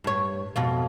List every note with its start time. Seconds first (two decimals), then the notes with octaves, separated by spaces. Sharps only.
0.04 G2 C#5
0.56 F2 B2 F4